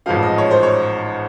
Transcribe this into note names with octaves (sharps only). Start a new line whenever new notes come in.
A1 G#2 F3 F5
D#5
C#5
C5
C#5